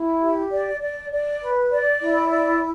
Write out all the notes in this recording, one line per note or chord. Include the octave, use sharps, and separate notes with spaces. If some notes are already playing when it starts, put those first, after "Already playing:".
Already playing: E4
G4
D5
D5
D5
B4
D5
E4
D5